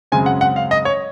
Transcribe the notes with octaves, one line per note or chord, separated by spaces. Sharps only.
F#2 C#3 G#3 C4 G#5
F#5
F#5
F5
D#5
C#5